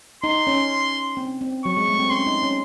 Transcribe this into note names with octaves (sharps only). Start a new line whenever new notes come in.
D#4 C6
C#4
C4
C4
F#3 C#6
G#3
A3
C4
C#4 C6
D#4
C#4